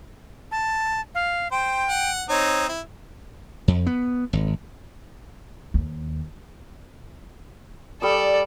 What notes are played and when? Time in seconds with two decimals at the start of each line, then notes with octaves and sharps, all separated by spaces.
0.52 A5
1.15 F5
1.52 C5 G5
1.89 F#5
2.29 C4 D#4 C#5
2.68 E4
3.68 F2
3.87 B3
4.33 G#1
5.74 D#2
8.02 G3 A4 D5 D#6